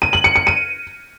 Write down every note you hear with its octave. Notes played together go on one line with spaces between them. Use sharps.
D#7
F#7
C#7
C#7
D#7